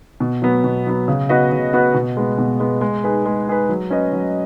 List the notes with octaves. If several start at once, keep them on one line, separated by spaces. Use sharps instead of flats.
B2
F#3 B3
B2
F#3 B3
C#3
B3 F#4 B4 D#5
C#3
B3 F#4 B4 D#5
B2
G#3 B3
B2
G#3 B3
G#3
D#4 G#4 B4
G#3
D#4 G#4 B4
F#3
C#4 B4 D#5
F#3